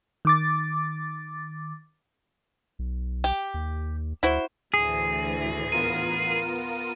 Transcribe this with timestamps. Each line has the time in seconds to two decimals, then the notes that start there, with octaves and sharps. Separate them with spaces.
0.25 D#3 D6 A6
2.79 B1
3.24 G4
3.54 D#2
4.23 D2 E4 F#4 C5
4.74 D2 A2 E3 G#4
5.72 B3 F4 A#4 D#7